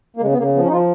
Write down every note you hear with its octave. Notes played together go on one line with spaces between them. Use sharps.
A#3
C#3 G#3
B3
C#3 A#3
F3 B3
C#4
D#4
F3 F4